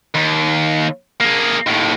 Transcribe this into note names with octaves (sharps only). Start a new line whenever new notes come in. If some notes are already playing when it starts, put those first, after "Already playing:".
D#2
A#3 G#4
D#2 A2